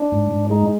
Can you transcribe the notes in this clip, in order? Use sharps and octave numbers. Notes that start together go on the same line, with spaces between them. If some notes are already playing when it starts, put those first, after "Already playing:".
Already playing: D4
G#2
G#2
G#3 D#4